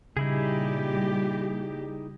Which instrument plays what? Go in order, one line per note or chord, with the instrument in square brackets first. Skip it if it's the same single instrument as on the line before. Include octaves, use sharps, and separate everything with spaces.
[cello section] A#2 G3 G4 [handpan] C#3 [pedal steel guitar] D#4 E4 G#4